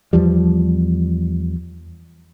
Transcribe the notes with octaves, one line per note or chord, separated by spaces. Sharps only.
E2 F3 G3